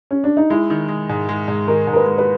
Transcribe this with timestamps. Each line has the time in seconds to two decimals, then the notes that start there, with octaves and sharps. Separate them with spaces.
0.11 C#4
0.24 D4
0.37 D#4
0.50 G#3 E4
0.70 D#3
0.89 G#3
1.09 G#2
1.29 G#3
1.48 G#2
1.67 D#3 A#4
1.87 G#2
1.93 A#4
1.96 B4
2.06 G#3
2.18 B4